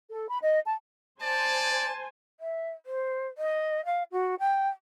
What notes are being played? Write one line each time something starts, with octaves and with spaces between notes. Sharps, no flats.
A4
B5
D#5
A5
C5 D5 G#5 A5
E5
C5
D#5
F5
F#4
G5